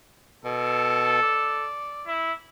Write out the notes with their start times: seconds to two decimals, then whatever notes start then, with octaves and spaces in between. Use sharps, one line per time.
0.45 B2 A4
1.22 D5
2.07 E4